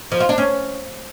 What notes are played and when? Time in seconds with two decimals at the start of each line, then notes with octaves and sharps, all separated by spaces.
0.12 F3
0.20 F4
0.29 D4
0.38 C#4